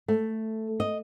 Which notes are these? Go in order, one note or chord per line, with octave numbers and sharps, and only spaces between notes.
A3
D#5